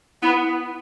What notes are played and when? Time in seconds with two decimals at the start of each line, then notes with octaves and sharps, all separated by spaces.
0.22 B3 E4